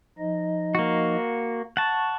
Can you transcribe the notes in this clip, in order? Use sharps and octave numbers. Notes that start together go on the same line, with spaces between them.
F3 D#4 D#5
A#3 F#4
F#5 A5 C#6